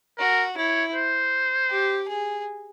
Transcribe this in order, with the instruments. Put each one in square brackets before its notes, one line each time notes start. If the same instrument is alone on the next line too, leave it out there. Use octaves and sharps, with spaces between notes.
[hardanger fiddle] F#4 [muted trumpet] A#4
[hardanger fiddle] E4 [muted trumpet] C#5
[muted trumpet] C5
[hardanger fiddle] G4
G#4